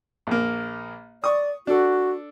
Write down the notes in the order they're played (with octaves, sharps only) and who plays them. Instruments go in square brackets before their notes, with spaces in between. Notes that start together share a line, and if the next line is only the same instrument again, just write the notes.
[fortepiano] A#1 A#3
[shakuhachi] D5 [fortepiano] C#6 D#6
[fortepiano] D4 A4 [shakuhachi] F#4